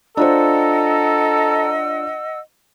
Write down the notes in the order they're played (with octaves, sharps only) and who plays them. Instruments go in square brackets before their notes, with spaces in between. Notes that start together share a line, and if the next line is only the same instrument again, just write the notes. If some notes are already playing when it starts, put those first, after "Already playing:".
[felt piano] D4 F4 C5 [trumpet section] A4 A#5 [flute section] D#5 F#5 E6